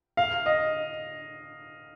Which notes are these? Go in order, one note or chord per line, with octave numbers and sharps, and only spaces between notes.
F5
D#5